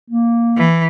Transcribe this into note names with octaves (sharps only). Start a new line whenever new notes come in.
A#3
E3